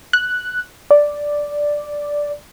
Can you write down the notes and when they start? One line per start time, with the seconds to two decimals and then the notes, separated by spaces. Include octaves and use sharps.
0.13 F#6
0.91 D5